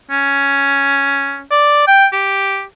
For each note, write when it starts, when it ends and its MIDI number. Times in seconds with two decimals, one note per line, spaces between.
0.11 1.42 61
1.51 1.87 74
1.87 2.06 79
2.12 2.63 67